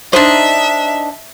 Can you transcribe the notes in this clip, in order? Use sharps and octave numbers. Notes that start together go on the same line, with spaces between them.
D4 D#4 C5 D#5 E5